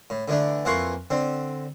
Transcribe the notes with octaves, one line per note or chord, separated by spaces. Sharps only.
A2
D3 E3 A3 D4
F2 E3 A#3 F#5 C6 C#6
D3 C4